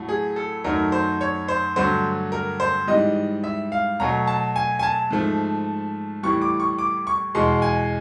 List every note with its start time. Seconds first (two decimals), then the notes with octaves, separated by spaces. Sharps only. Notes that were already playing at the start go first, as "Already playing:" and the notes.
Already playing: A2 F#3 A3
0.09 G#4
0.36 A4
0.64 F#2 D#3 F#3 A3 A#4
0.92 C5
1.21 C#5
1.48 C5
1.76 G2 D3 F#3 A3 C5
2.32 A#4
2.60 C5
2.87 G#2 E3 G3 D#5
3.44 E5
3.72 F5
4.00 B2 F#3 A3 A#5
4.27 A5
4.56 G#5
4.79 G#5
4.83 A5
5.11 G#2 F3 A3
6.23 A2 E3 G3 C#6
6.42 D6
6.60 C#6
6.78 D6
7.07 C#6
7.35 E2 B2 G#3 C6
7.62 G#5